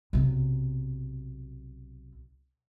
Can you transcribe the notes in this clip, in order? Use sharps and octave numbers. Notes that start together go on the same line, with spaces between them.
B1 C3